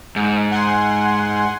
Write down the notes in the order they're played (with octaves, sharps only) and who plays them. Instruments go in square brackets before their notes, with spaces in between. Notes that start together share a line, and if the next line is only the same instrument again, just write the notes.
[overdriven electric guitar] G#2
[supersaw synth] F#5 G#5 C6